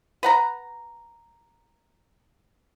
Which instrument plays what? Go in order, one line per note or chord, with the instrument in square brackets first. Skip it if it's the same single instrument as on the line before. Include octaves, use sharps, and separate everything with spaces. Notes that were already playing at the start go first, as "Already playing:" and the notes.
[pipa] B4 F#5 A#5